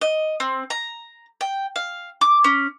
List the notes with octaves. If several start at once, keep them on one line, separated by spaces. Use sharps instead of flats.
D#5
C4
A#5
G5
F5
D6
C#4